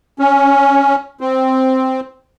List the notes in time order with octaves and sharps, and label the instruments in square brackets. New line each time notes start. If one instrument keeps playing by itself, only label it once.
[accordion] C#4
C4